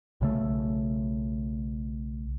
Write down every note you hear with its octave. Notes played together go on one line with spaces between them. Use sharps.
B1 C#3 A3